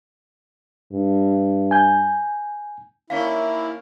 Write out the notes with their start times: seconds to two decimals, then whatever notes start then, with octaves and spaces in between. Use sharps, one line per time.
0.93 G2
1.71 G#5 G6
3.10 D#2 A#3 C#4 E4 D5 F5